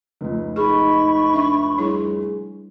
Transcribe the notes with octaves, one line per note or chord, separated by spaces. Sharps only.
F1 C#2
D#4 G#4 A4 B5 C#6
D4 E5
G3 E4 G#4 C#5